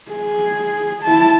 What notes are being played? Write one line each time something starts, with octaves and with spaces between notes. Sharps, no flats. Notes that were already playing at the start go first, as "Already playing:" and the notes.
G#4
E4 A5